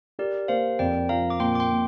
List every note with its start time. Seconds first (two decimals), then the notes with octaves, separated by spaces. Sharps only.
0.19 G4 A#4 D5
0.48 A#3 C5 F5
0.79 F2 D5 G5
1.09 F3 F5 A#5
1.30 D6
1.40 A#2 G5 C6
1.55 D6
1.60 G5 C6
1.70 A#2